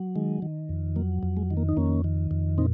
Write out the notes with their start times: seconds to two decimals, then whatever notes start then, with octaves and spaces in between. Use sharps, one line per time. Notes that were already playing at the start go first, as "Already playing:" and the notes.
Already playing: F#3
0.16 D#3 G#3
0.42 D#3
0.69 F2
0.96 F#3 A#3
1.23 F2
1.37 G#3
1.51 D#3
1.57 A#3
1.69 D#4
1.77 F2 A#3 C#4
2.04 D#3
2.31 F2
2.58 A#2 C4 D#4